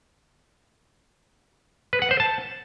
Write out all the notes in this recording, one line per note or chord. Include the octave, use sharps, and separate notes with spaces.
B4
F#5
C5
A5